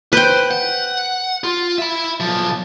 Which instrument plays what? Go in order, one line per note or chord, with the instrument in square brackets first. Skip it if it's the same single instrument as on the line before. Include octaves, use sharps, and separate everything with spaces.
[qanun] B4 G5 [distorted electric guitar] C5
[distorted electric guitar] F#5
F4
E5 B5
B1 F3